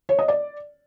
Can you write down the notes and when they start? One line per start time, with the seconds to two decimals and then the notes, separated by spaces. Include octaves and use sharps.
0.09 C#5
0.19 D#5
0.28 D5